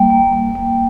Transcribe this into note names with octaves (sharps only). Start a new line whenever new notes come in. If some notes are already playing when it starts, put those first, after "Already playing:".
Already playing: G3 A#3 G5
A#3
A#3
A#3